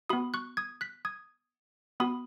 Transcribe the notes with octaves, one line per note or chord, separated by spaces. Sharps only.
B3 F#4 B5 D#6
C#6 F#6
D#6 G#6
F#6 B6
D#6 G#6
B3 F#4 B5 D#6